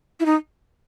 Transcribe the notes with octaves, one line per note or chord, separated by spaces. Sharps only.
E4
D#4